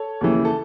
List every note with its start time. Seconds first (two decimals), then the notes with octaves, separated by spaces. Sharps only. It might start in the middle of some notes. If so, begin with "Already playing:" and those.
Already playing: A4 C#5
0.21 D#2 C#3 E3
0.45 A4